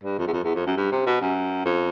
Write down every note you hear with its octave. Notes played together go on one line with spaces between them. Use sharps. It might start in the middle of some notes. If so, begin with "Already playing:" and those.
G2
F2
E2
F2
E2
F2
F#2
G2
C3
B2
F#2
F2